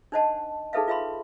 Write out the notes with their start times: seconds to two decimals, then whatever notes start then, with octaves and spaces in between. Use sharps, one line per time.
0.12 D4 D#4 C5 D#5 F#5 A5
0.73 D#4 G#4 A4 B4 E5 F5
0.88 F4 B4 E5 F5 B5 C6